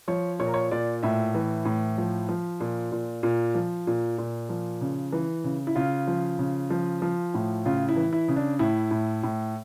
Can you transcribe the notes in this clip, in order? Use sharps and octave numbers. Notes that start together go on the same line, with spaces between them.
F3 C#5
A#2 C#5
A#4
C#5
A#2 D5
A2 E5
E3
A2
F3
F3
A#2
A#2
A#2
F3
A#2
A#2
F3
C#3
E3
C#3
E4
C#3 F4
F3
C#3
F3
F3
A2
C#3 F4
E4
E3
E4
C#3
D4
A2 E4
A2
A2